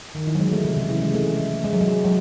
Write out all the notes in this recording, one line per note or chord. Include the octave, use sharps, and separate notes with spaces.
D#3
E3
F#3
G#3
A3
C3
C#3
E3
G#3
A3
G#3
F#3
G#3
F#3